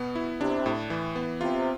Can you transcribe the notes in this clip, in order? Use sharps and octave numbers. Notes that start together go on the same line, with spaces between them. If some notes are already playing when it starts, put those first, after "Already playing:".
Already playing: B2 B3
E4
C3 D4
A2
E3
B3
C3 F4